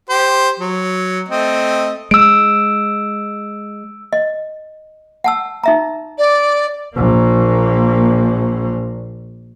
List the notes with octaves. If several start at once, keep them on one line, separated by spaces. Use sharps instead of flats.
G4 C5
F#3
A3 C4 D#5
G#3 E6 D7
D#5
F#5 A5 E6
D#4 E5 A#5
D5
A#1 A#3